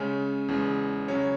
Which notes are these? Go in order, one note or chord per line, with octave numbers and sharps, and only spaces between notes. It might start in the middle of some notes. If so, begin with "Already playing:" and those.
Already playing: C#3 G#3 C#4
E2 C#3 G#3
C#3 F#3 C#4 C#5